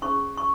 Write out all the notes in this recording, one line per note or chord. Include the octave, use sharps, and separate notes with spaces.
C#4 G#4 C5 C#6
C#6